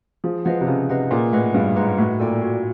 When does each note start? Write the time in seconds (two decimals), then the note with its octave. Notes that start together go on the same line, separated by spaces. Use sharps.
0.24 F3 G#4
0.45 F3 B4 D#5 F#5
0.61 C3
0.67 C#3 G#4
0.89 C3 B4 D#5 F#5
1.11 A#2 G#4
1.33 A2 B4 D#5 F#5
1.54 G2 G#4
1.76 G#2 B4 D#5 F#5
1.98 A2 F#4
2.19 A#2 A4 D5 G5
2.42 F#4